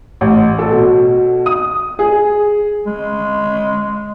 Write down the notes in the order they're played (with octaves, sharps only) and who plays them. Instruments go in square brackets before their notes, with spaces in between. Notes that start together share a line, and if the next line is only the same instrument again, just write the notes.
[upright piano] A1
A4
B2
D#6
G#4
[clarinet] G#3